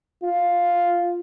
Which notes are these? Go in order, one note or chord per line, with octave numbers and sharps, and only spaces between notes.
F4